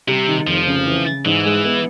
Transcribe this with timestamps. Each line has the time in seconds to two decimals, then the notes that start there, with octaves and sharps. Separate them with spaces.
0.08 C3 G3
0.28 D#3
0.47 F1 F3
0.67 C#3
0.86 E3
1.06 C#3
1.25 G#2 E3
1.45 G#3
1.65 B3